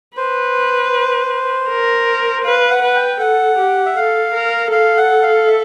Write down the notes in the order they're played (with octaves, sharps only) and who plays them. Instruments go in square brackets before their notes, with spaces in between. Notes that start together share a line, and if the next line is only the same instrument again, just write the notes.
[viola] B4 [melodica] C5
[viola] A#4
[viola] B4 [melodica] F5
[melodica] F#5
[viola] B4
[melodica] G5
[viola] A4 [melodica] F#5
[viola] G4
[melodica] E5
[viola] A4 [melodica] F5
[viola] A#4
[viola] A4 [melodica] F5
[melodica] F#5
F5
E5